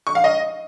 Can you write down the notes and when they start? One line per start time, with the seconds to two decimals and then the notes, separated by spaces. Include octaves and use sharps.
0.07 C#6
0.15 F5
0.24 D#5